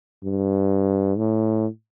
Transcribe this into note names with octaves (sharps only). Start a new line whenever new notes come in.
G2
A2